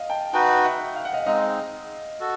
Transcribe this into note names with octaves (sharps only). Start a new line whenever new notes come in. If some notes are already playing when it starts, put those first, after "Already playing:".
Already playing: D#5 F5
G5 A5
D#4 F#4 B4 G5 A5
E5 F#5
F5
F#5
D#5 F5
G#3 C4 D#4 D#5 F5
F#4 A4